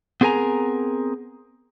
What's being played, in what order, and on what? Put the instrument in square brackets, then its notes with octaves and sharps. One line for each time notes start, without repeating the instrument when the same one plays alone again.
[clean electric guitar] B3 C4 G#4 A#4 G#5 A#5